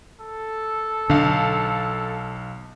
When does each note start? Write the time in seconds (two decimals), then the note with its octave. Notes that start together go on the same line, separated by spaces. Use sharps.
0.20 A4
1.10 B1 D3 F5